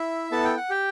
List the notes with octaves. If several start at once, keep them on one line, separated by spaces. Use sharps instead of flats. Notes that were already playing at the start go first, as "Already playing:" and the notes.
Already playing: E4 E5
B3 E4 A4 A5
G5
F#5
G4 G5